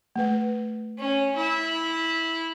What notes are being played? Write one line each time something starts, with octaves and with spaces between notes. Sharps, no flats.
A3 B4
C#4
E4